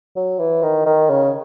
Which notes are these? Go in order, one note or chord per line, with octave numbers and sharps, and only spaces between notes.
F#3
E3
D#3
D#3
C#3